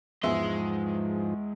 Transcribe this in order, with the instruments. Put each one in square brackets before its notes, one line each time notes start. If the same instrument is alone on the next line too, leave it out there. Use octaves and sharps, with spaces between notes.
[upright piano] E2 E5 [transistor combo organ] G#2 F3 [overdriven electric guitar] G#3 C6